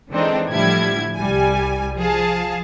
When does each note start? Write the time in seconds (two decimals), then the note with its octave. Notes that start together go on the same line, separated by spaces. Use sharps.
0.11 D3 E3 G#3 C4 D4 D#4
0.50 A2 D3 F3 G3 E4 G#6
1.16 C2 G3 G#5
1.96 F3 G#4 F5 A5